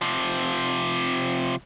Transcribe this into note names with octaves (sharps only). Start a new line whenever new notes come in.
C3 F3